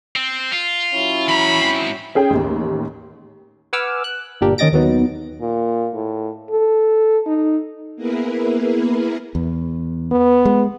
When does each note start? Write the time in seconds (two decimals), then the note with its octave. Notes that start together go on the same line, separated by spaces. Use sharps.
0.16 C4
0.52 F4
0.94 F#3 C#4 E4
1.28 E3 A#5 B5
1.61 G#2 C4
2.15 C#4 G#4 G5
2.30 A1 D#2
3.73 B4 F#5 G#5 D6 E6 F6
4.04 F#6
4.41 G1 A#2 D4 G4 A#4
4.58 D#3 C#4 D#5 A6 A#6 D7
4.72 D#2 F#3 B3 D#4
5.41 A#2
5.94 A2
6.50 A4
7.26 D#4
7.96 A#3 B3 E4 G#4 A#4 B4
9.35 E2
10.11 B3
10.45 G#3